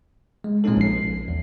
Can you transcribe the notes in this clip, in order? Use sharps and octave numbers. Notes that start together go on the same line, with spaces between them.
G#3
A#2 G#3 C4 C#4 D#4 A4
A#1 C7
E2